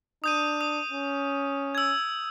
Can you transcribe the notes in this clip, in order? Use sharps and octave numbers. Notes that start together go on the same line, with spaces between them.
D4 D#6 G6 D#7
D#6
C#4
E6 G#6